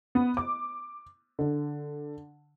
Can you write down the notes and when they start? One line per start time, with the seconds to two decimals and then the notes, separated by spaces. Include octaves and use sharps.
0.15 B3
0.37 D6
1.39 D3